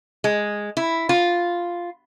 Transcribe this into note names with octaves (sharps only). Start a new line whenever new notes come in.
G#3
E4
F4